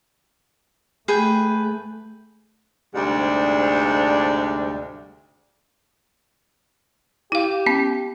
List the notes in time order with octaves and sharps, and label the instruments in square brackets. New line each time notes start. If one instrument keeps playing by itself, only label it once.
[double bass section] A3 [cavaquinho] G#4 B4 G5
[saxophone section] D2 G#2 C3 G3 D4
[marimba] E4 F5 [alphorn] G4
[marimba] B3 C#4